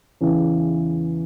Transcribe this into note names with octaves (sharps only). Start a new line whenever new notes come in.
E2 C#3 E3